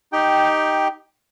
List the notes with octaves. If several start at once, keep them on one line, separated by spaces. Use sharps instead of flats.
D#4 G4 G5